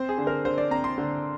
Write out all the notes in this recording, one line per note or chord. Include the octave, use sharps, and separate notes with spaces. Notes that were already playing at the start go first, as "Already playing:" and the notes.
Already playing: C4 C5
G#4
D3
A#4
D3 C5
D5
C4 A#5
C6
D3